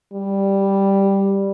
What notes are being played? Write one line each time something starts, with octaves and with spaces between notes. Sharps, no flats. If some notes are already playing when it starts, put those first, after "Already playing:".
G3